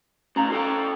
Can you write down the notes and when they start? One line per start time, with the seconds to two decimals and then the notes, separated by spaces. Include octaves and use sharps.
0.36 A2 C#4 F5 A#5
0.50 F4 A4 G5